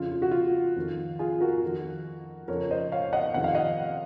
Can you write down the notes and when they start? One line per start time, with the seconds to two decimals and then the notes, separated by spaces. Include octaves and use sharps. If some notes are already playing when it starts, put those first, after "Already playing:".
Already playing: F2 C#3 F4
0.12 F4
0.22 F#4
0.31 F4
0.76 F2 D#3
1.19 F4 G#4
1.40 F#4 A#4
1.63 F2 D#3
2.48 F2 C#3 A#4 C#5
2.71 C5 D#5
2.92 C#5 F5
3.13 D#5 F#5
3.34 F2 C3 D#3 F#5
3.44 F5
3.55 D#5 F#5